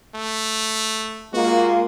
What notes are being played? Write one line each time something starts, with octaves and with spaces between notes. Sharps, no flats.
A3
G#3 A#3 F4 F#4